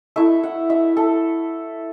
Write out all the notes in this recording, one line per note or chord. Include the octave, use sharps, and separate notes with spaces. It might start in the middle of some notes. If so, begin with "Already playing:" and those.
A3 E4 E5
F#5
E5
A4